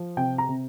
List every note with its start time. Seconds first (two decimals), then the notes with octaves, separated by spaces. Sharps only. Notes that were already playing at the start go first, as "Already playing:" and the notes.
Already playing: F3
0.17 C3 G5
0.38 A#5
0.49 C3